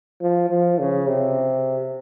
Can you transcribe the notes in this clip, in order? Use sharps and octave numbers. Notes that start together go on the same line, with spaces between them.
F3
F3
C#3
C3